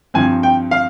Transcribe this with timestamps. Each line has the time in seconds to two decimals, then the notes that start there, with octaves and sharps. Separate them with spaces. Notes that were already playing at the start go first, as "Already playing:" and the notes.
0.14 G2 F3 C4 G#5
0.43 G5
0.71 F5